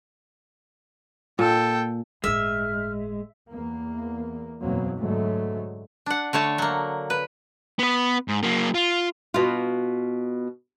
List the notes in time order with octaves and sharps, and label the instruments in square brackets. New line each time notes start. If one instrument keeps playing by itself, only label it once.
[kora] A#2 [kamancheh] A4 G5
[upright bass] G1 A2 [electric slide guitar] G#3 [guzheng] E5 [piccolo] F6
[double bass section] E2 A#3
F#1 E2 B2 F#3 A#3 C4
G#2 D3 F#3 G#3 A3
[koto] D4 F#5
D3 A3 C#5 A5
F#3 A#3
B4
[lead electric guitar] B3 B4
G#2
F#3 A#3
F4
[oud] B2 F4